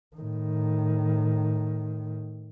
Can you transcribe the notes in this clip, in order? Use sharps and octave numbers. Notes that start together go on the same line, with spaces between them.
A2 D#3